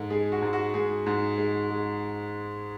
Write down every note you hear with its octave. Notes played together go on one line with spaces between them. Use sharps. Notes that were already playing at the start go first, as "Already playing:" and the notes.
Already playing: G#2 G#3 A4
G#3 G#4
F#4
G#2
F#4
G#2 G#4
G#2
G#3
G#3